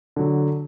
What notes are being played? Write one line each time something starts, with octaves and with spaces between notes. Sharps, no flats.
D3 F#3